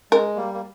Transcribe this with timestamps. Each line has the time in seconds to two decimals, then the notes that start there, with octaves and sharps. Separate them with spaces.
0.12 G#3 A#4
0.36 G3 A#3
0.54 A#3